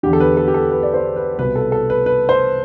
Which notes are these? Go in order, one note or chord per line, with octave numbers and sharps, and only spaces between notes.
E2 D3 G4
A4
B4
A4
G4
A4
B4
D5
C5
B4
C2 B2 B4
A4
A4
B4
B4
C5